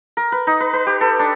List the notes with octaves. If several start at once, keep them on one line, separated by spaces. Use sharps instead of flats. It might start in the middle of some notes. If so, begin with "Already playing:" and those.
A#4
B4
D#4
B4
B4
G4
A4
D4